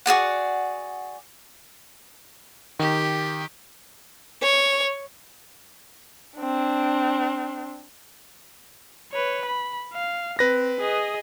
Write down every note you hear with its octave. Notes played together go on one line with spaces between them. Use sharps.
F#4 G#4 D5 F#5
D#3 G4
C#5
C4 D4
B4 C#5
B5
F5
C4 B4 A#6
G#4 D#5